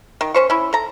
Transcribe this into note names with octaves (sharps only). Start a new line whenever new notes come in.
D#3
C#4 C5 C#6
C#4 E4
A4 A#5